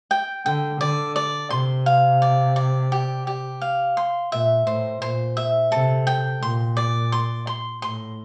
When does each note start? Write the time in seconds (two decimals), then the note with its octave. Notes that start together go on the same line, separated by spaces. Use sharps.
0.11 G5
0.46 D3 G5
0.81 D3 D5
1.16 D5
1.50 C3 C6
1.86 F5
2.22 D5
2.56 D5
2.92 G4
3.27 G4
3.61 F5
3.97 C6
4.32 A#2 E5
4.66 A2 C5
5.02 A#2 C5
5.37 E5
5.72 C3 A4
6.07 G5
6.42 A#2 C6
6.77 D5
7.12 C6
7.47 C6
7.82 A2 C6